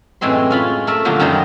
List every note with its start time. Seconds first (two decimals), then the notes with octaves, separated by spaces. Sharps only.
0.21 F#2 A2 E3 G#3 C4 C6
0.50 C#4 F4 B5
0.87 A3 A#4 E5
1.05 A#2 D3 F3 F#3 A#3 F4
1.19 F#2 D#3 F#3 G3 D#4 D#5